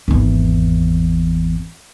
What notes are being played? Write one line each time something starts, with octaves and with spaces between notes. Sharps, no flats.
G#1 E2